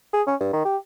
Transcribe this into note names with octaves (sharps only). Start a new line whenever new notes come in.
G#4
C#4
G2
D#3
G4